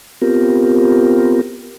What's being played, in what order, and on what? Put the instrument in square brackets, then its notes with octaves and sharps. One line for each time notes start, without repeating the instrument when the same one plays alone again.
[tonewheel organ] B3 C4 F4 G4 A#4